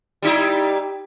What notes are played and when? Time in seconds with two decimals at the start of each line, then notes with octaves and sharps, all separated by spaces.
0.22 G3 D#4 E4